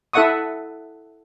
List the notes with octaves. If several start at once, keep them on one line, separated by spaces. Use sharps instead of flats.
E4 A4 E5 F#5 C#6 D#6